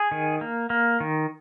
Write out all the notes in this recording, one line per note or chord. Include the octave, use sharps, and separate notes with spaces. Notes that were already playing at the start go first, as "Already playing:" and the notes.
Already playing: G#4
D#3
A#3
A#3
D#3